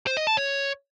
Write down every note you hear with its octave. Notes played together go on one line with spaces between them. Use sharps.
C5
D#5
A5
C#5